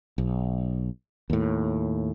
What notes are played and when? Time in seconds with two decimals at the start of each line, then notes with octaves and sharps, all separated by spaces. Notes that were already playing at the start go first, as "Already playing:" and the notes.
0.18 B1
1.30 D#2 A2